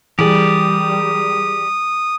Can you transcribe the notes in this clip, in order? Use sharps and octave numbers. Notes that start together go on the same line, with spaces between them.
E3 G3 G4 G#4 A#4 D5 D#6